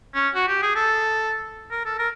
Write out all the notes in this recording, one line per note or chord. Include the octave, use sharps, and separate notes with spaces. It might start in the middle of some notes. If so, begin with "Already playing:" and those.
C#4
F#4
G4
G#4
A4
A#4
A4
A#4